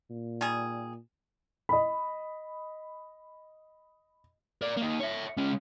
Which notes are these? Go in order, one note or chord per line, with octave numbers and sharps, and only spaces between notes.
A#2
D#3 G3 G#4
D#5 B5
A#4 D5
A#3 D#4
C#5 E5
G#3 C#4